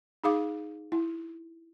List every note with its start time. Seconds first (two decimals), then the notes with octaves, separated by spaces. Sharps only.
0.24 D#4 G#4 F5 D6
0.92 E4